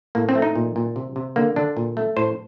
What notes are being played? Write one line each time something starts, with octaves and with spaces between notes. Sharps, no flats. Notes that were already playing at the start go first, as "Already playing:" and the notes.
A2 A#3
C4
A3
D#4
A#2
A#2
C3
C3
D3 A#3
D3 D4
A#2
A3
A2 C5